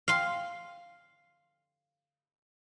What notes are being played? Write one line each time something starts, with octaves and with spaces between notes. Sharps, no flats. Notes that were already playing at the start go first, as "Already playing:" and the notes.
F5 C6